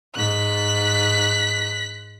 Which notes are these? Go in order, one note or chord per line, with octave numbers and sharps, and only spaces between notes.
G#2 F#6 B6